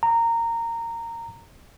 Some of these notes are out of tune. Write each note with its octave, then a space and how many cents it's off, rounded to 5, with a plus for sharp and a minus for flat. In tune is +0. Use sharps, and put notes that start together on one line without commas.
A#5 -15